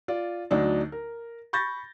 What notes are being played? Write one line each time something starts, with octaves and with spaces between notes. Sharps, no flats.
F4 D5
D2 F#3 D4 D#4
A#4
B5 C#6 G6 A6 A#6